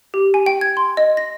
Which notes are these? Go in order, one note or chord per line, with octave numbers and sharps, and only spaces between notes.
G4
G#5
G5
G#6
C6
D#5
A#6